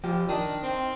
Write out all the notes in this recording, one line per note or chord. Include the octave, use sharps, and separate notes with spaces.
F3 G4
D#3 D4 D#4
C4